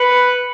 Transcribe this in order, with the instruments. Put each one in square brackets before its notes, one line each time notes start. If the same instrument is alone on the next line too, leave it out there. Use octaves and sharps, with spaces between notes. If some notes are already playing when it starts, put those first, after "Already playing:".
Already playing: [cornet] B4 [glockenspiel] C#7 F#7